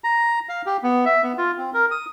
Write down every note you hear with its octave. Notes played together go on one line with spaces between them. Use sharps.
A#5
F5
G4
B3
E5
B3
F4
C4
A#4
D#6